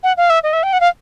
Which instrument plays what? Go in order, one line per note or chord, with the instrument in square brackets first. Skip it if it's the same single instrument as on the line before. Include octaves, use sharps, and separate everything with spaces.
[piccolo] F#5
F5
E5
D#5
E5
G5
F#5
F5